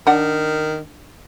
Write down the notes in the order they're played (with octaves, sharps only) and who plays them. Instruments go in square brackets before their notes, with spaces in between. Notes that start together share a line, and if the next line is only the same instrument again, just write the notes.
[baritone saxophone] D#3 [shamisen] D4 D5 F#5